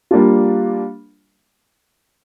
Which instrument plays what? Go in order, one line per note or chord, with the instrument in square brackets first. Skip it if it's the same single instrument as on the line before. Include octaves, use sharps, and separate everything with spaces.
[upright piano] G3 A#3 D4 F4